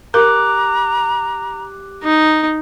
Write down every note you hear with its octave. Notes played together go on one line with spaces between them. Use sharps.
G4 A#4 A#5 D6 F#6
D#4